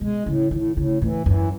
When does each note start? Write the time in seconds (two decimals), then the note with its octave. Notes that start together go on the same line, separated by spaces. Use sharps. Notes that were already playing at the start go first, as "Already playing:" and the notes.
0.01 B2 G#3
0.26 A2 C#3
0.51 A2 D#3
0.76 A2 C#3
1.02 A2 E3
1.26 F#2 E3